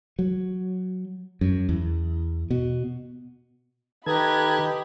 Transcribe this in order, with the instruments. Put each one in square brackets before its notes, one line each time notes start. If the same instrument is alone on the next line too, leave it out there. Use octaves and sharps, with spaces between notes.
[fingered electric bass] F#3
F#2
E2
B2
[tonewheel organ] D#3 A4 G#6 [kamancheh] G4 B5 [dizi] B4 [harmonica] D#5 A#5